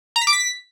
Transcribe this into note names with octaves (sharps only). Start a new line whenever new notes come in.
A#5
B6
D6
B6